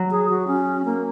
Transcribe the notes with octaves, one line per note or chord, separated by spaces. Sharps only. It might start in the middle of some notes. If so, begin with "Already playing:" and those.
Already playing: F#3
G#4
F#4
C#4
A#3